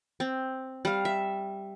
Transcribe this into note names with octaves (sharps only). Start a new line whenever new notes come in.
C4
G3 F5
E5